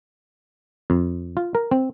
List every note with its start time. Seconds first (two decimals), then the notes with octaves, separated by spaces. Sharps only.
0.90 F2
1.37 F4
1.55 A#4
1.71 C4